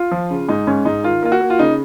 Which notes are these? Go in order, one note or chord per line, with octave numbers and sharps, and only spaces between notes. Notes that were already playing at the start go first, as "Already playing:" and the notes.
Already playing: F4
F3
C#3
G#2 D#4
G#2 C#4
G#2 D#4
D#3 F4
A#3 F4
F#4
A#3
F4
C#3 D#4